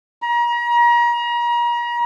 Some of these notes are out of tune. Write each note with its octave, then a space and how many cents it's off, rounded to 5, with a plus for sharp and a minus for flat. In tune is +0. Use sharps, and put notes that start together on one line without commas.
A#5 +35